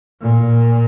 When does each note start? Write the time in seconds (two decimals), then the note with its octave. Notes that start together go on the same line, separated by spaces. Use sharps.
0.22 A#2